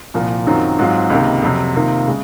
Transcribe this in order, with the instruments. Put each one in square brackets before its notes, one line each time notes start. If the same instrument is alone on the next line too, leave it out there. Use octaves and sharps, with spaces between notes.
[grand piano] C2 A#2 F3 A#3
F#2 D#3 F#3 C4 F4
G#2 F#3 C4 F4
C#2 C3 D#3 A#3
F2 C3 F#3
C3 D#3 A#3 F4
C#3 G#3